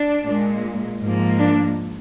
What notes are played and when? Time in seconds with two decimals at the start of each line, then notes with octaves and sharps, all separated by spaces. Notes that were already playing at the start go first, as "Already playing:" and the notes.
Already playing: D4
0.24 A#2 G#3
1.01 G#2 F3 A#3
1.39 D4